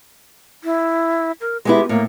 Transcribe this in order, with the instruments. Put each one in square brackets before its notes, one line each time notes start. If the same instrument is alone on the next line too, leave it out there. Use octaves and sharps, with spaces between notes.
[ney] E4
A#4
[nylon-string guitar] G#3 B3 E4 [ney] G4
[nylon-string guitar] A2 [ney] A#3